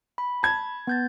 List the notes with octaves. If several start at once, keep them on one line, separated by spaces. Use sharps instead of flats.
B5
A5 G#6
B3 G6 A6